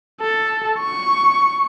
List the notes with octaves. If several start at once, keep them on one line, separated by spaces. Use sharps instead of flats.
A4
C#6